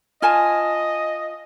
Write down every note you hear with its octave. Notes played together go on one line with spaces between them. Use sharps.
F4 D#5 G#5 A5